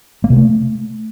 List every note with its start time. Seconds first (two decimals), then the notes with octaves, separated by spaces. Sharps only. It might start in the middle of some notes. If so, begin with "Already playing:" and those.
0.24 A#3
0.30 C3
0.36 A3